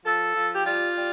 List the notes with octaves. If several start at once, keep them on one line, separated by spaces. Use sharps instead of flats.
F3 A4
F3
G4
G3 F4
G3